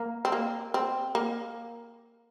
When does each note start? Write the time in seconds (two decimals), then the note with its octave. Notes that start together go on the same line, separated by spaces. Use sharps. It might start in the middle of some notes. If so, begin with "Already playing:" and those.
Already playing: A#3
0.25 C4
0.32 A#3
0.74 C4
1.15 A#3